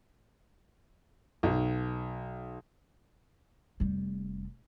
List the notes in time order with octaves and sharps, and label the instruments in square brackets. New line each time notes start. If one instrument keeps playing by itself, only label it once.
[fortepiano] B1
[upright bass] F1 G3